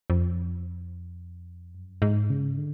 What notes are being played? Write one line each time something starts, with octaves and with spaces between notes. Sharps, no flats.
F2
F#2
G#2
C#3
D3